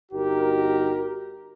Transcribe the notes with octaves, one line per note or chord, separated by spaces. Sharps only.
G1 D#4 F#4 G4 A#4